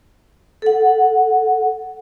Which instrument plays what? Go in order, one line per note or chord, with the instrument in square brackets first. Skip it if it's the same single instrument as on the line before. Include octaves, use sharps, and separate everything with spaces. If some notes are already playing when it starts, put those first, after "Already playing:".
[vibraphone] A4 F#5